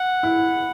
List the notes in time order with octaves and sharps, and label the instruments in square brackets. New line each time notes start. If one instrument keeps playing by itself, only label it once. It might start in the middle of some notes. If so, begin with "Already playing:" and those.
Already playing: [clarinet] F#5
[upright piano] E4